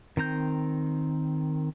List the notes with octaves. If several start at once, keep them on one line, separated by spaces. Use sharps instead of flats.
D#3 C4 A#5 G6